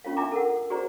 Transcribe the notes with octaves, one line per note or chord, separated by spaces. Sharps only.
C#4 F4 C#5 F5
D4 E5 G#5 A#5 D6
A4 A#4 F#5
F#4 G#4 C5 D5 A#5